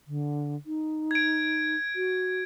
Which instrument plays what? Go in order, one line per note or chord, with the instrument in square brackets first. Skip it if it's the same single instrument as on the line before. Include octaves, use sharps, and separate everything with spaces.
[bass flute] D3
D#4
[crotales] G#6 D7
[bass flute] F#4